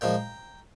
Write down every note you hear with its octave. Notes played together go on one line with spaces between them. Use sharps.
A#2 F3 G#3 G5 A#5